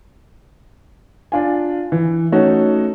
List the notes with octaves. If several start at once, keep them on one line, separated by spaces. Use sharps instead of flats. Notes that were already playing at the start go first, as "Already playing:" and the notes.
D4 F4 G#5
E3
A3 C#4 D#4 F#4